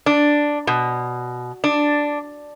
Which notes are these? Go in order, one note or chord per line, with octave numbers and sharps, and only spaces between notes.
D4
B2
D4